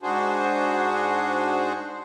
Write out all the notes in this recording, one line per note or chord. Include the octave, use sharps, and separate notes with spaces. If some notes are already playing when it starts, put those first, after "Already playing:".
G#2 D4 F#4 G#4 C5